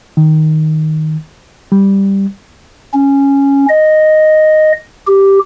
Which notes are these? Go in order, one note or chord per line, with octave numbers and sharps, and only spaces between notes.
D#3
G3
C#4
D#5
G4